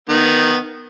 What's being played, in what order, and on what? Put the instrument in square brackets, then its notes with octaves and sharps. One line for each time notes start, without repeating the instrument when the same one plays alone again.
[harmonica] D#3 B3